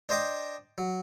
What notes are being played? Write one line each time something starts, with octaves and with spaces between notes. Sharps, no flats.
D4 C5 D#5 G5 D6
F#3